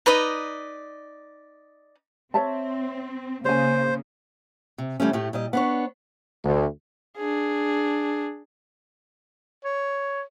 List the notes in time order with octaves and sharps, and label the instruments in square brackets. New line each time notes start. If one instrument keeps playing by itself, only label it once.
[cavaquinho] D#4 B4 D5 D#5
[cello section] C4 [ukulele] C#5 E5 A5
[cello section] C#3 A#3 [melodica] C5 [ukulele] C#5 G#5
[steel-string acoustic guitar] C3
E3 G3 A3 C#4
A2 A3 G4
A#2 G3 D#5
B3 D4 C#5
[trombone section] D2
[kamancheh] D4 G#4
[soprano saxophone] C#5